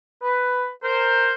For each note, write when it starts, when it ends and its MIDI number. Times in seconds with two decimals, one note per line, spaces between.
0.23 0.68 71
0.83 1.34 70
0.83 1.34 72